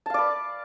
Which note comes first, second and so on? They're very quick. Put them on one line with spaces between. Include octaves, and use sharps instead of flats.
A5 F5 D5 B4